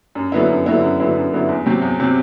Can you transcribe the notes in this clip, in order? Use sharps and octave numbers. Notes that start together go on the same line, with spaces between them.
F#2
D3 F#3 B3 E4
F#2
D3 F#3 B3 E4
F#2
D3 F#3 B3 E4
F#2
D3 F#3 B3 E4
E2
C3 F#3 C4
E2
C3 F#3 C4